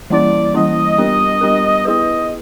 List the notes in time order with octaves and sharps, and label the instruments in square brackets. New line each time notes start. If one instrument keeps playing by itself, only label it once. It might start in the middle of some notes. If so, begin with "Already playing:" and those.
[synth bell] E3 G3 A#3 C#4 E4 [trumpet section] D5
[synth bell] E3 G3 A#3 C#4 E4 [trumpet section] D#5
[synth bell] G3 B3 D4 G4 A#4
G3 B3 D4 G4 A#4
[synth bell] B3 E4 G#4 B4 [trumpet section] D#5